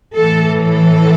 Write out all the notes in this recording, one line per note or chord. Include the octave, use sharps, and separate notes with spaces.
A2 E3 A4
A4